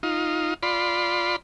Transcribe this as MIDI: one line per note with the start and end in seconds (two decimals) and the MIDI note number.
0.03 0.54 63
0.03 0.54 65
0.63 1.36 65
0.63 1.36 74
0.63 1.36 83
0.63 1.36 84